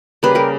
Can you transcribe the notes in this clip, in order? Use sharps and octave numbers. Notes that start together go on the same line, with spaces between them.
C#3 G3 A#3 G#4 B4
G4 A#4